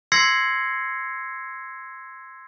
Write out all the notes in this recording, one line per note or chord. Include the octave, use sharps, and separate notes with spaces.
C6 E6 G#6 A#6 C7 C#7